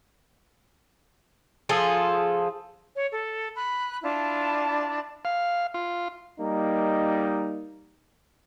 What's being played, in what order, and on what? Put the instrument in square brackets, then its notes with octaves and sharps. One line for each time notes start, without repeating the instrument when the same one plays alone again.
[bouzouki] F3 F4 G#4 A4
[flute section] C#5
A4
B5 F#6
D4 E4 F4 A5
[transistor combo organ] F5
F4
[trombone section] G3 A#3 D#4